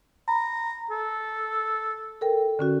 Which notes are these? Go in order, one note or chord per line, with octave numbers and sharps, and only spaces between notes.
A#5 B5
A4
A4 A#4 G5
D3 C#4 F#4